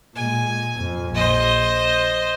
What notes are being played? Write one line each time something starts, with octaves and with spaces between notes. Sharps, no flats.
A#2 G#3 G#5
F2
A#1 C5 D#5